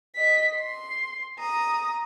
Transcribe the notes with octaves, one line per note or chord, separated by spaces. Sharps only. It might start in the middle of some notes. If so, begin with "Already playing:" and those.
D#5 B6
C6
A#5 D#6